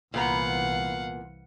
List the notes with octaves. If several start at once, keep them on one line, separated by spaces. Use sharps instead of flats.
C2 A#2 E3 B3 F5 F#5 A#5